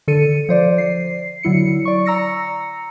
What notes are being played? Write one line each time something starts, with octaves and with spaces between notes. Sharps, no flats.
D3 A4 C#7 D#7
F3 C5 D5
C7
D3 F#3 E4 C#7
D5 C#6
A#5 E6 A#6 C#7